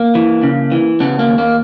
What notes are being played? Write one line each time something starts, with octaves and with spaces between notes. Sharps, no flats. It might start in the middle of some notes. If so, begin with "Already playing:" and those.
Already playing: A#3
E3
C#3
E3
C#3 B3
A#3
D#2
A#3